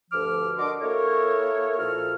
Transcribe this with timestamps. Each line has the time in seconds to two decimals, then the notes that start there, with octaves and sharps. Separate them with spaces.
0.11 D2 G2 F3 D6 F6
0.57 D4 F#4 A#4 D#5 C6 D6
0.81 A#3 E4 A4 A#4 C#5
1.79 A#2 F3 F#4 A4 F6